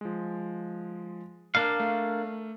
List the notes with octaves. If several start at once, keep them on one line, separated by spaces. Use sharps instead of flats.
F3 G#3
A#3 D4 F5 A5 D6
A3